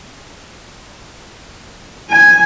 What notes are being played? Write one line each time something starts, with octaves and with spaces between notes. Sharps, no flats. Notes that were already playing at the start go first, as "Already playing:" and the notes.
G#5